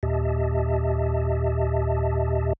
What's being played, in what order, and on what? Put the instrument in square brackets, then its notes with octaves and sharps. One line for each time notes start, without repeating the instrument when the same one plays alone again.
[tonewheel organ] D#2 A#2 G4 D#5 E5 A5